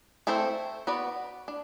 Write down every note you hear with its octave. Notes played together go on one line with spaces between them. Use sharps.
A3 C4 E4 A4 C5
B3 F#4 B4 D5
D4